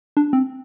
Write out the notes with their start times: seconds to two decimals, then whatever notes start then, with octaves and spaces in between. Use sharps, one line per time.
0.17 D4
0.33 C4